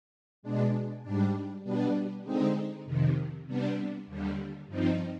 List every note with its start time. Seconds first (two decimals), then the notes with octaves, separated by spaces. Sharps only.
0.43 B2 G#3 D4
1.03 G#2 G3 D4
1.64 B2 G3 B3 D4
2.24 D3 G#3 C4 D#4
2.85 F2 C3 D#3
3.46 C3 G3 B3 D4
4.07 D#2 D3 G3
4.67 G2 F3 C4 D#4